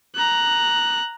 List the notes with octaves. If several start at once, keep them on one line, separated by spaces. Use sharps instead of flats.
A#5 F#6